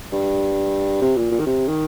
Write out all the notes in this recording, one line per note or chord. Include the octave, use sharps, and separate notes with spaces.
G2
C3
A#2
A#2
D#3
C3
D#3